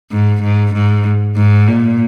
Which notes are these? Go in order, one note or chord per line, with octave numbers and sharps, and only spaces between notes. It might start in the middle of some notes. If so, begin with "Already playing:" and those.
G#2
G#2
G#2
G#2
A#2